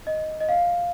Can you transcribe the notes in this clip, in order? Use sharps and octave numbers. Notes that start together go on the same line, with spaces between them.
D#5
D#5
F5